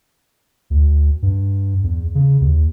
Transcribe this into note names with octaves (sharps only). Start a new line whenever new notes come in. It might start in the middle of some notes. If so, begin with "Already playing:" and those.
D2
G2
E2
C#3
D#2